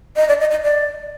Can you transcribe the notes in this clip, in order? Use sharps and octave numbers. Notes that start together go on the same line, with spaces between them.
D#5
D5
D#5
D#5
D5